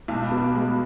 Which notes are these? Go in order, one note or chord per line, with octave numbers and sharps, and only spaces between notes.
B1 G#3
B3
B2
B3
G#3
B3